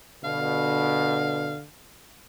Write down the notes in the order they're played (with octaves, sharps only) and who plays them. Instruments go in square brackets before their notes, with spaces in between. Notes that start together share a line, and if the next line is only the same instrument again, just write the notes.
[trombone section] G2 B2 [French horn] D3 [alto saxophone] F5